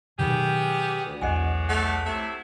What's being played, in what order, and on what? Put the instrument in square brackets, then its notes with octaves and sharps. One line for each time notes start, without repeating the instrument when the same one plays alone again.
[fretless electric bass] B2 D#3 F#3 [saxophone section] B3 C#4 G#4 [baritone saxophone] G4
[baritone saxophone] D2
[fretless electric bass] B1 E2 [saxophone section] A2 E3 G#3 [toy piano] D#5 F#5 G#5
[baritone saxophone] A3 [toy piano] F#5
[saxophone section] C3 F#3 E4 [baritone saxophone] A3